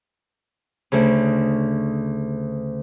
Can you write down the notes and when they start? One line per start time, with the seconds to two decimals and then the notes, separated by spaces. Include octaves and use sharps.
0.92 D2 C#3